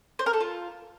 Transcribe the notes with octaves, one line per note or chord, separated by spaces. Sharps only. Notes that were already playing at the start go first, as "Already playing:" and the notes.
C5
A#4
A4
F4